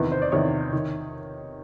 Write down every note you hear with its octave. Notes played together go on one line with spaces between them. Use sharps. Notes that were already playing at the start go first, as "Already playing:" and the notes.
Already playing: E2 C3 D#3 B4
C5
D5
E2 C3 D#3 C#5
D#3